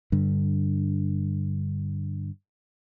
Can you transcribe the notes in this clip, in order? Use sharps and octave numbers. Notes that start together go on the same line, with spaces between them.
G2 D3